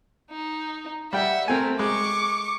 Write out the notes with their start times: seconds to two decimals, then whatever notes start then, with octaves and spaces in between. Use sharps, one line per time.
0.31 D#4
1.13 G3 E5 F#5 G5
1.48 A3 C4 A#4 G#5
1.79 G#3 C#6 D6